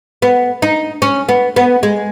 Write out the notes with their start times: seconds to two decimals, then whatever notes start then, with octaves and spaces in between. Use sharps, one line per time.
0.22 B3
0.62 D#4
1.02 C#4
1.29 B3
1.56 B3
1.83 G#3